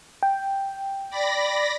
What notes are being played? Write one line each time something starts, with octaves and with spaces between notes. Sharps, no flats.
G5
D5 B5 A#6